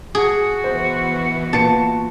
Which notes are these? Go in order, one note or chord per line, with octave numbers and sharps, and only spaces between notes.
F#4 G#4
B2 E3 C5
A#2 B4 A5 C#7